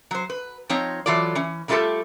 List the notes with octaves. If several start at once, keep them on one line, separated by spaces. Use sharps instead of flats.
F#3 C5
B4
F3 C4 D#4 C#5
E3 F#3 F4 A4 D5
E3 C#4
D3 G3 A3 F4 G4 A4